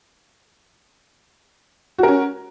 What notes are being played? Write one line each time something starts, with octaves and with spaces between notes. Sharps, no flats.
C#4 F#4 A#4